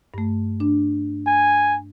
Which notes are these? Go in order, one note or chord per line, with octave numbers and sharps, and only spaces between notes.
G2 A3
D4
G#5